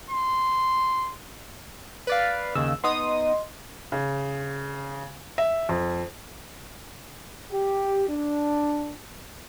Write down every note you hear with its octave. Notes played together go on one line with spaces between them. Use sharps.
C6
B4 D5 F5
D#2 C#3 E6
B3 D#4 D#5 C6 D#6
C#3
E5
F2
G4
D4